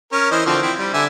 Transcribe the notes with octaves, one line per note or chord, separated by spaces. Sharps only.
C#4 A#4
E3 C5 D#5
D3 F3 C4
C4 E4
G3
D3 E5 G#5